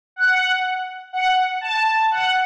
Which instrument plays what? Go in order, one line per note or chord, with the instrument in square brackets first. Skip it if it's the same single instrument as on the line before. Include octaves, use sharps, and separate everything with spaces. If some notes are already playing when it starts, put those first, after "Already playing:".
[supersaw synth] F#5
F#5
A5
F#5